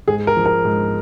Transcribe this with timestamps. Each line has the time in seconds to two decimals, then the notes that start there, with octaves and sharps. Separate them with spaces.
0.08 G#2 G#4
0.27 A#4
0.37 F3
0.46 A#4
0.65 G#2